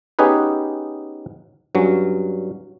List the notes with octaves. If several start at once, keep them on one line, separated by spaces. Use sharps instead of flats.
B3 C#4 D#4 G4 G#4 B4
G2 F#3 C#4